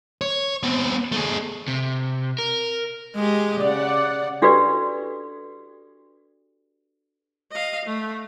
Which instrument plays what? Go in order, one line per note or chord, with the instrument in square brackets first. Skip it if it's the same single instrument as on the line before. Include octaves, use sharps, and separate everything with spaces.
[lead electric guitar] C#5
B3 C4
A3 G#4
[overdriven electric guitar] C3
A#4
[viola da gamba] G#3 G4 G#4
[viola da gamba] C#3 [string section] D5 F#5
[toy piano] D4 F#4 G4 A4 B4 D5
[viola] D#5 F5
A3